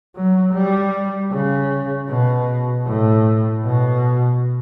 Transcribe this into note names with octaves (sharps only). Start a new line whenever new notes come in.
F#3
G3
C#3
B2
A2
B2